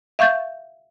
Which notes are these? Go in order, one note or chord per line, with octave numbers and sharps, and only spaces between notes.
E5 F5 C#6 G6 A6